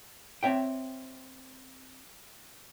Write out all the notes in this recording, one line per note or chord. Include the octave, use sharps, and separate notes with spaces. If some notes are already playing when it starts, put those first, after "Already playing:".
C4 C#5 E5 G5